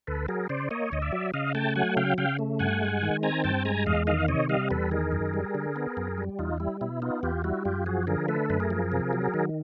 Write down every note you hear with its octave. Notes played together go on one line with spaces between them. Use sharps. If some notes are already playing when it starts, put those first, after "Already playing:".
D2 A4 B4
F#3 G#4 A#4
C#3 C5 D5
A#3 C#5 D#5
D2 D#5
D5 E5
F#3
C#3 D#5 F5
A3 G5 A5
F#3 F#5 G#5
C#3 F5 G5
C#3 F5 G5
A3
G2 F#5 G#5
G#3
D#3
C4 G#5 A#5
G2 G5 A5
G#3 G#5 A#5
E2 D#5 F5
D#3 D#5 F5
C3 C#5 D#5
G3 D#5 F5
E2 A4 B4
D#3 G#4 A#4
F#2
G3
D3
B3
F#2
G3
E2 D#4 F4
G3 E4
B2 E4
B3 D#4 F4
E2 F4 G4
G3 E4 F#4
F#2 F4 G4
F3 F#4 G#4
D3 G#4 A#4
A3 A4 B4
F#2 B4
G#4 A#4
F3
C3
F#3
D#3